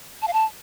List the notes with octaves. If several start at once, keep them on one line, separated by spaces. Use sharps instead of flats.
A5
F5
A5